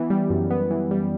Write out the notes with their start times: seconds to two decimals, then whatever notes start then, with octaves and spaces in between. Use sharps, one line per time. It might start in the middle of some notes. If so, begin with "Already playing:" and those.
Already playing: E3 B3
0.10 G3
0.30 F#2
0.50 B3
0.71 E3
0.91 G3